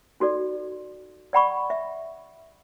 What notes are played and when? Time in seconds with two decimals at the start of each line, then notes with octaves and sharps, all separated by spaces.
0.20 D#4 F#4 A4 D5
1.33 D5 F#5 B5 C#6
1.70 E5